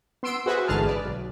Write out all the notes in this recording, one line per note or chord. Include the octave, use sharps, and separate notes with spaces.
B3 C6 E6 D7
F#4 G#4 B4 C5 E5
A1 G#2 D3 G#4 A5 F6
B4 D5
B1